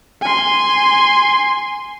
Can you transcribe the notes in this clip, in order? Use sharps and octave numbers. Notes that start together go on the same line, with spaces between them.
G#5 C6